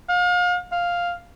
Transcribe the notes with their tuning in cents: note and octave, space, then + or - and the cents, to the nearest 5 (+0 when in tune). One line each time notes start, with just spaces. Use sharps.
F5 +35
F5 +5